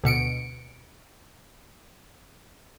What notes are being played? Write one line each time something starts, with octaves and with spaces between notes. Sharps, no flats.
D2 B2 C#7 D7